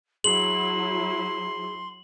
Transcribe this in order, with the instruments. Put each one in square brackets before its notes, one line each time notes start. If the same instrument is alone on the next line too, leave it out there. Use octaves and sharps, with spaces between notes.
[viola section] F#3 E4 [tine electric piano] G#4 [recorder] C6 [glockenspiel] F#7